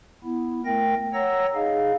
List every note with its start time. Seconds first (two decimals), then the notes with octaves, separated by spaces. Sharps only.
0.24 B3 E4
0.65 A3 A#4 G5 A#6
1.14 C#5 F#5 A#5 E6 A#6
1.55 D#4 G#4 D#5 F5